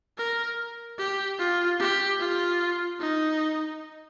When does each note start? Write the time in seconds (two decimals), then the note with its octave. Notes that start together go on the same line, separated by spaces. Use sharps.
0.18 A#4
0.98 G4
1.38 F4
1.79 G4
2.19 F4
3.00 D#4